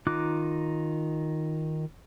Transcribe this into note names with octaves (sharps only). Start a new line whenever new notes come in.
D#3 D#4 F4 D6 F#6